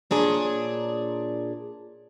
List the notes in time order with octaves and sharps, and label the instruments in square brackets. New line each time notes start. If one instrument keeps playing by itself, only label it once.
[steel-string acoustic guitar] A#2 D4 G#4 C#5